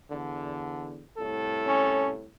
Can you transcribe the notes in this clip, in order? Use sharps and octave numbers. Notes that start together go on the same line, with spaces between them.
E2 D3
C2 A2 A4
C#4